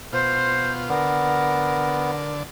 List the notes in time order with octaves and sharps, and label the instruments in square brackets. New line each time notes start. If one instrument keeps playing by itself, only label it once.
[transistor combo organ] B2 F4 [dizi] C5
[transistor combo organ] D3 [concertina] B3 [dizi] A#4